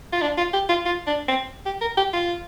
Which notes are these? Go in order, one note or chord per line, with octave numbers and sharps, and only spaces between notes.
F4
D4
F4
G4
F4
F4
D4
C4
G4
A#4
G4
F4